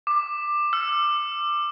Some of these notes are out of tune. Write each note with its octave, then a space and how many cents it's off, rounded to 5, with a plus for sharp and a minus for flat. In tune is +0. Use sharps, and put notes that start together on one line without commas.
D6 +15
E6 +45